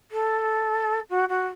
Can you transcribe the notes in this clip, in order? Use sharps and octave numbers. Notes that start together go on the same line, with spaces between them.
A4
F#4
F#4